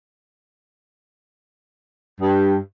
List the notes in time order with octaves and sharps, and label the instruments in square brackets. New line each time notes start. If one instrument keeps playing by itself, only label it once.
[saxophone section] G2